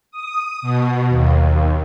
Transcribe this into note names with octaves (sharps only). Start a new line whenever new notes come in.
D#6
B2
D#2